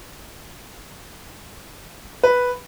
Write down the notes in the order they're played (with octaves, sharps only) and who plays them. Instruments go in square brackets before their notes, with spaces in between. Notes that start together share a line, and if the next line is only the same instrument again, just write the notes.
[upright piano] B4